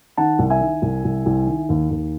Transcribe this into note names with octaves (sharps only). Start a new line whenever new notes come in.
D#3 F#5 A5
C2
E5 G#5
D#3
C2
C2
C2
D#3
D#2
D#2